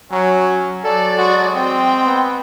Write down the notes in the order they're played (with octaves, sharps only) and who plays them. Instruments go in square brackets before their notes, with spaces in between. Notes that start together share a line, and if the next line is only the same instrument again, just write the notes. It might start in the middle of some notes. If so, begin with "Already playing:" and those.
[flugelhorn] F#3 [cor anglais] C#4
[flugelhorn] F#3 [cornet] A4 [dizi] D5
[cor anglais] G#3 [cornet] F#4
[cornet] C4 [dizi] G5
[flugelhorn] B3